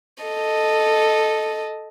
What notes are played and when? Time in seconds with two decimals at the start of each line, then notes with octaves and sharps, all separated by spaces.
0.24 A4 D#5